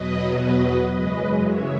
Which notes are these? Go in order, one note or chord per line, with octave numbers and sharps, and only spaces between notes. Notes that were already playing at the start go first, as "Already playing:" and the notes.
Already playing: E2 B2 F#3 B4 D#5
B4 D#5
F#2 C#3 E3 G#3 B4 D#5
C#5 E5